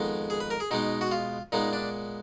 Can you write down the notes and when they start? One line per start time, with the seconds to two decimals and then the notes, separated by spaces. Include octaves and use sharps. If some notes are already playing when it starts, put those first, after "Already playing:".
Already playing: F2 D#3 G#3 B3
0.30 G#4
0.40 B4
0.51 A#4
0.60 G#4
0.71 B2 G#3 B3 D#4
1.01 F#4
1.12 F4
1.52 A#2 G#3 B3 D#4
1.73 D4